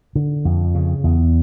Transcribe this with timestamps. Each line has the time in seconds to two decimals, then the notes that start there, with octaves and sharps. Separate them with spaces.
0.15 D3
0.45 F2
0.75 C#3
1.04 E2